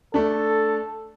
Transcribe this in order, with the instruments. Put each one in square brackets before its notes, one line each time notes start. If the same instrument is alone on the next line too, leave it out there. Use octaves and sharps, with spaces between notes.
[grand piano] A3 D4 [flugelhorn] A4